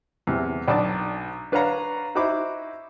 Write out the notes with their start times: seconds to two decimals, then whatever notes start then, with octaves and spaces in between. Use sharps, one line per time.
0.27 E2 C3
0.68 B1 D4 D5 A5 D6
1.52 D4 B4 C#5 F5 F#5 A#5
2.15 D#4 E4 F#4 C5 B5 D6